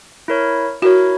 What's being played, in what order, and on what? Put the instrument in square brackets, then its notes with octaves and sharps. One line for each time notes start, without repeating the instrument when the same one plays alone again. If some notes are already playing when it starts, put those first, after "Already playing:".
[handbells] E4 A#4 C#5
[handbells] E4 A#4 C#5 [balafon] F#4